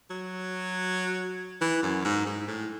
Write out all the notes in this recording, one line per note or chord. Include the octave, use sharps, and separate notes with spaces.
F#3
E3
F#2
G#2
G#2
A2